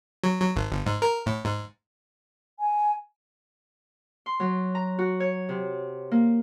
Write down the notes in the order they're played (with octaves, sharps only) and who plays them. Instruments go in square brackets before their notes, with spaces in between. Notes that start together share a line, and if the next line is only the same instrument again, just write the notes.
[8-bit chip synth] F#3
F#3
G#1
G1
G#2
A#4
A2
G#2
[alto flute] G#5
[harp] C6
F#3
A#5
F#4
C#5
C3
A#3